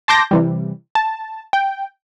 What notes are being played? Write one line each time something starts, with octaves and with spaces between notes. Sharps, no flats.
A5 C6 D6 G6 A#6
C3 E3 G3
A5
G5